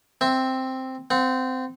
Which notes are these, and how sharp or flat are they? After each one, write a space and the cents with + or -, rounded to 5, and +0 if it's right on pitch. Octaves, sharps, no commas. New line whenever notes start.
C4 +0 E5 +0
C4 -20 F#5 -35